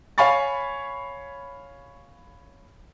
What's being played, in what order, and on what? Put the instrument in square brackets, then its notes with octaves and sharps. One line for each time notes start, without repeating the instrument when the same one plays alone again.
[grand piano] C#5 F5 G#5 B5 C#6 A6